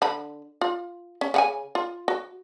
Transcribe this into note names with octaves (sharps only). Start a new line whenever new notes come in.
D3 B5
F4
C#4
C#3 F#5 G#5
F4
F#4